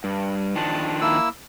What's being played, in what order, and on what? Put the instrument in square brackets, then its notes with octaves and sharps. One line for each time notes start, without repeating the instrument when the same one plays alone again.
[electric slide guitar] G2
[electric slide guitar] D#3 F3 D4 [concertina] A5
[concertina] A#3 E4 E6